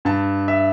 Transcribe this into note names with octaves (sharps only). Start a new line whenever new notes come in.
G2 A5
E5